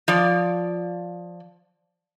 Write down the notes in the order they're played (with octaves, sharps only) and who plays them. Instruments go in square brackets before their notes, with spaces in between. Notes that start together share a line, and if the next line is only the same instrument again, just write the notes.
[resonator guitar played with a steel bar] F3 D5